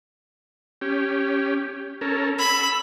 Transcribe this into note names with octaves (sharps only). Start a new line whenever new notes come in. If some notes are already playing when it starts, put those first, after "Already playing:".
C#4 G4
C#4 A4 A#4
B5 E6